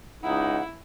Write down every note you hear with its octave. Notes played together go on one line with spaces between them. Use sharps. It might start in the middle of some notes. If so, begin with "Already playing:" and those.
C#2 D#4 E4 F#5